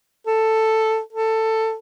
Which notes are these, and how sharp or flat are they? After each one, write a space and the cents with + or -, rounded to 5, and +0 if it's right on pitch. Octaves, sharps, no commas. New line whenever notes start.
A4 +5
A4 +15